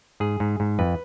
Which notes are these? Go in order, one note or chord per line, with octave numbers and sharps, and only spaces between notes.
G#2 G#4
G#2
G#2
F2 B4